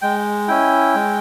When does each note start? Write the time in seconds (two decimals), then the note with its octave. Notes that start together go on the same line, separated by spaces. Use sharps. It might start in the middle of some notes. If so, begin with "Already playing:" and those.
0.02 G#3 G5
0.48 C#4 E4 G5
0.95 G#3